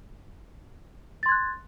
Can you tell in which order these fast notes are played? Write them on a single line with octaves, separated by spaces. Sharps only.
A6 C6 G#6 F#6